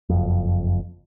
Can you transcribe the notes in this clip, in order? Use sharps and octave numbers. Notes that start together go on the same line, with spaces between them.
F#1 F2